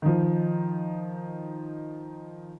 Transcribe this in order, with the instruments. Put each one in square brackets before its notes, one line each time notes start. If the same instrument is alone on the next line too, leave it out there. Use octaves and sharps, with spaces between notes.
[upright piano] D#3 F3